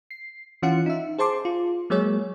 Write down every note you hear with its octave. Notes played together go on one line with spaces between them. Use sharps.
C7
E3 C#4 F4 F#5 C#7
D#4 E5
G#4 C5 A5 C6 D6
F4
F#3 G#3 A#3 G#4 C#5